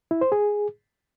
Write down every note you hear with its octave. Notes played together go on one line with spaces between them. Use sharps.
E4
C5
G#4